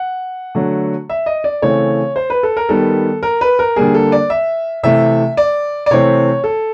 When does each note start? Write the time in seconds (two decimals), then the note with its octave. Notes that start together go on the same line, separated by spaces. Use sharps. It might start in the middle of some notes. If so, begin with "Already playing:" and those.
Already playing: F#5
0.55 D3 F#3 A3
1.10 E5
1.26 D#5
1.44 D5
1.62 C#3 E3 A3 C4 C#5
2.16 C5
2.30 B4
2.43 A4
2.57 A#4
2.69 D#3 G3 B3 A4
3.23 A#4
3.41 B4
3.59 A#4
3.76 D3 G3 A#3 G#4
3.94 A4
4.12 D5
4.30 E5
4.83 C3 E3 A3 E5
5.37 D5
5.86 D5
5.91 C3 E3 A3 C4 C#5
6.44 A4